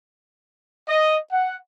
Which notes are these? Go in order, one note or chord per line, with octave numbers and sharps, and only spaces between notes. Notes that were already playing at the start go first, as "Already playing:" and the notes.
D#5
F#5